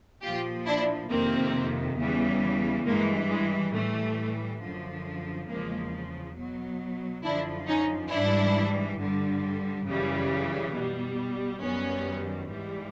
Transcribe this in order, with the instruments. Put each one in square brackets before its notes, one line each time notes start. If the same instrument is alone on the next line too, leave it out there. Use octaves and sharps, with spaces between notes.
[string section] A#2 F3 F4 G4
D4 E4
F2 C3 D#3 A#3 C4
E2 C#3 E3 G3
G2 E3 G3 G#3 A#3
G#3
A2 E3 G3 A3
F#2 D3 F3
E2 C#3 F3 G#3 A#3
B2 F#3
F#2 D3 F3 D4 E4
C#4 D#4
G#2 E3 G3 D4 E4
G2 D3 G3
F#2 C#3 E3 G3
B2 G3
F#2 D#3 G3 B3 C#4
G#2 E3 G3